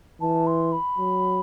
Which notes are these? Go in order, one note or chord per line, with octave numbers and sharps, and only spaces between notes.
E3 A5
C6
B5
F#3